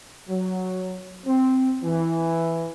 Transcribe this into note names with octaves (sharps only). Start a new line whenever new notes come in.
F#3
C4
E3